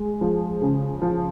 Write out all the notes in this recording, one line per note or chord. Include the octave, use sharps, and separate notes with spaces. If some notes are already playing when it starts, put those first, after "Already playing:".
Already playing: G#3
F3
C#3
F3